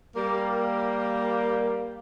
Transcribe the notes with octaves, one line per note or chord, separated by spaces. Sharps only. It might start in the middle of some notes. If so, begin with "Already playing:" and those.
G3 A#3